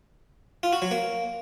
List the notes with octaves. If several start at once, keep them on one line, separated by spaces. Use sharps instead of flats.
F4
F#4
F#3
A#3